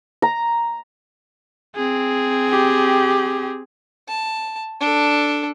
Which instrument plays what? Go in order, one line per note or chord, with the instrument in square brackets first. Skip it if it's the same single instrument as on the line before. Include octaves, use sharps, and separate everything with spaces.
[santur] A#5
[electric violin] C4 G#4
[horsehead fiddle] G4
[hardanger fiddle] A5
D4 A4